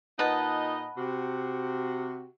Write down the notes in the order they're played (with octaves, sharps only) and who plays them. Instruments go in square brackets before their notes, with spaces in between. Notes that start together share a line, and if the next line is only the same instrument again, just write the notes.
[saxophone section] A#2 D#4 D#5 [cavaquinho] B4 F#5 A5
[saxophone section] C3 F#4